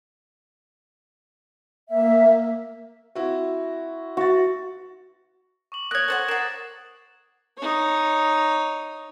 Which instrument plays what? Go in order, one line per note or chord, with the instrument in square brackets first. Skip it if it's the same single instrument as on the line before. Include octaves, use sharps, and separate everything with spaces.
[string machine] A#3 [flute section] E5
[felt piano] C4 E4 F#4
[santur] F#4 [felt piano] E5 A6
[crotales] C#6 D6 F#7
[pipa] A#3 C#5 [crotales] D#6 A#6 F#7 [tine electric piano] F#6 G#6
[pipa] A4 C5 F#5 [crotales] F#7
[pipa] A#4 F#5 [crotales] A6 C7 E7
[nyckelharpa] D#4 C#5